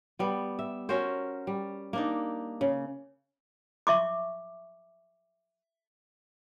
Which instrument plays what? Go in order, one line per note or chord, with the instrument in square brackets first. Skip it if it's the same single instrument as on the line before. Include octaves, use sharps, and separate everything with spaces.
[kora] G3 B3
E5
C#4 F#4 A#4 C5
G3
A#3 D4 D#4
C#3
[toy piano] E5 C#6 D6